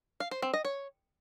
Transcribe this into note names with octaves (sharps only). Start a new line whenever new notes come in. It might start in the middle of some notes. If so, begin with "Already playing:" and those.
F5
C5
C4
D#5
C#5